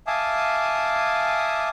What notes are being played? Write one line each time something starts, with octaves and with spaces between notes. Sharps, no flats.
E5 F5 G#5 A5 D6 D#6